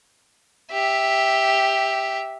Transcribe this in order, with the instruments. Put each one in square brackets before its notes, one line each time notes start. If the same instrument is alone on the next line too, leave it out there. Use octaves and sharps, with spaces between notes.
[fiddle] G4 E5